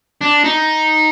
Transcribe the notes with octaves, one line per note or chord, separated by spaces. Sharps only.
D4
D#4